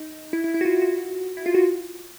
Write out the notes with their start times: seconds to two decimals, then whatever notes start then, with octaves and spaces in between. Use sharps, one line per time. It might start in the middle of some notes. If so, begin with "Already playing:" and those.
Already playing: D#4
0.33 E4
0.44 E4
0.54 E4
0.61 F#4
0.65 F4
0.82 F#4
1.37 E4
1.46 F4
1.54 F#4